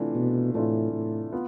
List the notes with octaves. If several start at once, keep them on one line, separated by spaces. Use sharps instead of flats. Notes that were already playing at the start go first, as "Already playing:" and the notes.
Already playing: C3 E3 A3 D4 F4
B2
A2 C3 E3 A3 D4 F4
A2
B3 F4